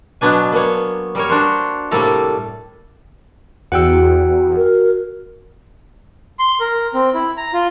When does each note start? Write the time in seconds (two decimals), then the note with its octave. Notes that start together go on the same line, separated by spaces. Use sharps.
0.21 B2 F#3 B3 D4 G#5
0.52 A#3 B3 C#5
1.15 G3 A#4 C#5
1.29 D4 F#4 C5
1.91 A2 C3 G3 A#3 A4 A#5
3.72 E2 F#4 F#5 G5 E6
4.57 A#4
6.39 C6
6.60 A#4
6.94 C4
7.14 E4
7.37 A#5
7.53 F4